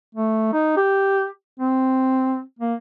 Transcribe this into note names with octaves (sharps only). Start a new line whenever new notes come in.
A3
D#4
G4
C4
A#3